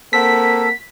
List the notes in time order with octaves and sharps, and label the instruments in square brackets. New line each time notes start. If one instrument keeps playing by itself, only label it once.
[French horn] A#3 [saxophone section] C4 F#5 [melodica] A4 [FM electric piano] B6